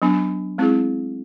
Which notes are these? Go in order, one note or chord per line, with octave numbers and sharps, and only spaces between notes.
F#3 B3 D4
G#3 C4 E4 G#4